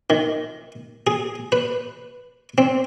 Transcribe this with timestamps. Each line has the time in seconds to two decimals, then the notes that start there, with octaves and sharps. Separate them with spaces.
0.10 D#3
1.07 G#4
1.52 B4
2.58 C4